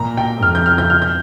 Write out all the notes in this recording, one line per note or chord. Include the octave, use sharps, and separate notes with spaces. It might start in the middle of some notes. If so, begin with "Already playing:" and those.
Already playing: A#2 A#5
G5
F2 F6
G6
F6
G6
F6
G6